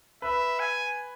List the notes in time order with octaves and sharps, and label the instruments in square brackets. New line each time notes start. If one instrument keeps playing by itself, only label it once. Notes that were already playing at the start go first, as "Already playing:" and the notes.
[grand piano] B4 [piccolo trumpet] E5
[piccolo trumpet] G#5